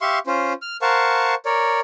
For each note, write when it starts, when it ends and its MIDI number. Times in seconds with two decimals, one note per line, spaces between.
0.01 0.19 67
0.01 0.19 76
0.01 0.19 77
0.01 0.19 84
0.01 0.19 85
0.27 0.53 61
0.27 0.53 65
0.27 0.53 72
0.62 0.77 89
0.82 1.35 70
0.82 1.35 72
0.82 1.35 77
0.82 1.35 78
0.82 1.35 81
0.82 1.35 85
1.45 1.81 70
1.45 1.81 73
1.45 1.81 74